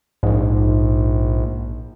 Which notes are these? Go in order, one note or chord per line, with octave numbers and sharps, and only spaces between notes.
A#1 G#2